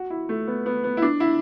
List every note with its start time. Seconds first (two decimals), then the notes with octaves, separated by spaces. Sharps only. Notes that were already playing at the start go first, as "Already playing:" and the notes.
Already playing: F#4
0.10 E4
0.29 A3
0.47 B3
0.66 B3
0.84 B3
0.97 E4
1.02 D4
1.20 E4